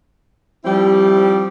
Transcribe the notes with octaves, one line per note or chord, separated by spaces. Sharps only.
F3 G3 C4 E4 G4